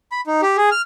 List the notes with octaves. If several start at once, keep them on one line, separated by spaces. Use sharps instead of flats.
B5
D#4
G4
G#4
F6